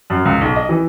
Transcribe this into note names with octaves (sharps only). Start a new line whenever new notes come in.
F#2
C#2
B1
D#5
E3